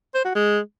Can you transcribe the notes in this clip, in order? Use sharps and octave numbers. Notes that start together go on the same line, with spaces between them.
C5
F#4
G#3